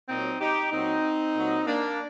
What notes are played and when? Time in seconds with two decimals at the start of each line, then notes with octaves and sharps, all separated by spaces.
0.09 A#2 F#3 C4 D#4
0.41 D#4 G4
0.72 A#2 F#3 C4 D#4
1.36 A#2 F#3
1.66 A#3 D4